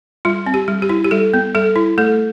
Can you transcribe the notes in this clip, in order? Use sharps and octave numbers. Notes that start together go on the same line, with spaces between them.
G3 F4
C4
G4
G3
G4
E4
G4
G3 A4
B3
G3 A4
E4
A3 A4